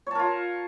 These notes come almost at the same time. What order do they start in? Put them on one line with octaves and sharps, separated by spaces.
C#5 A5 A#4 F4